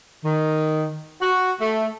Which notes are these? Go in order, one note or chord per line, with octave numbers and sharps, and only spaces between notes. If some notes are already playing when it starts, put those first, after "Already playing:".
D#3
F#4
A3